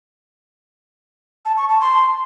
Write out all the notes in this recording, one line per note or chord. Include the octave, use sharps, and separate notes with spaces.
A5
C#6
A5
C6